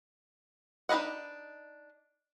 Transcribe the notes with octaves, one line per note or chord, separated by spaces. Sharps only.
D4 D#4 B4 D#5 F#5